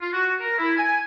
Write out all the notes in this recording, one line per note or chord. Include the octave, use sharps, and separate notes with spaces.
F4
F#4
A#4
E4
G#5